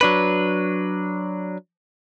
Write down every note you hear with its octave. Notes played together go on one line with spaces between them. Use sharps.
F#3 D4 B4